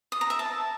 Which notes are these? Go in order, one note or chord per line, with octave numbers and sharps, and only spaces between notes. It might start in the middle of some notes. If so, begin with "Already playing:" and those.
D#6
A#5
E5
A5